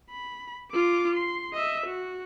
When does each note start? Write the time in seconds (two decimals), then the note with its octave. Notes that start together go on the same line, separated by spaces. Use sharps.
0.10 B5
0.72 F4 D6
1.15 C6
1.53 D#5 E5
1.86 F#4